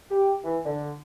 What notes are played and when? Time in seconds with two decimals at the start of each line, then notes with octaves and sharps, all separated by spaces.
0.11 G4
0.44 E3
0.66 D3